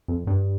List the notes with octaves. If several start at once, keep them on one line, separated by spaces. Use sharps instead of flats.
F2
G2